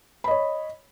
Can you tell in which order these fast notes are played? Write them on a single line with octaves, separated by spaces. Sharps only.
B5 D#5 C#5